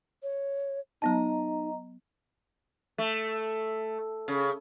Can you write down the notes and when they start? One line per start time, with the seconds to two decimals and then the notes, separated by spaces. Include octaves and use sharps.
0.23 C#5
1.02 F#3 B3 D#4 D#5 A5 A#5
2.98 A3
4.28 C#3